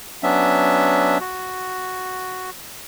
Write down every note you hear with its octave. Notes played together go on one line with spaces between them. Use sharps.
F#3 B3 C#4 D4 E5
F#4